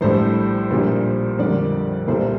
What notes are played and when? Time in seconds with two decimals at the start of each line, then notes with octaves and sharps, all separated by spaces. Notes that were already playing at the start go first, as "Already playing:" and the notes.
0.01 A#1 A2 G3 A4 C5
0.71 A#1 A#2 G3
1.39 F2 D3 G3 A#4 D5
2.07 C2 A#2 G3 A4 C5